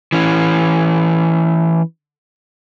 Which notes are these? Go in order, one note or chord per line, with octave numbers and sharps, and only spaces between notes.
E3 C#4